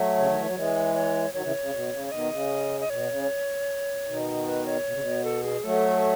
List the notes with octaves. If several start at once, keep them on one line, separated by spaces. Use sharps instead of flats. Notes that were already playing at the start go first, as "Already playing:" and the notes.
Already playing: F#3 A3
C#3 C#5
D#3
E3
F#3
E3 G#3
C#5
D#3 F#3 C#5
C#3 E3
C#3
B2
C#3
C#5
B2 D#3 D#5
C#3
D#5
B2 C#5
C#3
B2 D#3
B4
C#5
B2
C#3
B2
A4
G#4
F#3 A3 A4